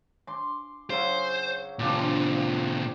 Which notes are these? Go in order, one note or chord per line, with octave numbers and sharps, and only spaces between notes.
C6 D6
C#3 F#3 C5
A#2 C#3 F3 D4 G4